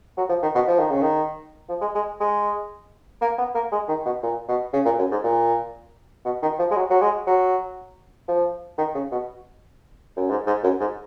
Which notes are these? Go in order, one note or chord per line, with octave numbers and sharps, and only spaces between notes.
F#3
F3
D#3
B2
F3
D#3
C#3
D#3
F3
G#3
G#3
G#3
A#3
B3
A#3
G#3
D#3
B2
A#2
B2
C#3
A#2
F#2
G#2
A#2
B2
D#3
F3
G#3
F#3
F#3
G#3
F#3
F3
D#3
C#3
B2
F#2
G#2
G#2
F#2
G#2